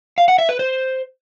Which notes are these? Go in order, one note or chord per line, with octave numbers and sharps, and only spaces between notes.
F5
F#5
E5
B4
C5